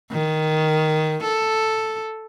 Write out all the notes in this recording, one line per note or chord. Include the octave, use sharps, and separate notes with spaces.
D#3
A4